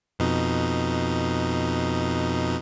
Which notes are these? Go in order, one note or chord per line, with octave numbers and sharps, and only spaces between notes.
F2 B2 D#4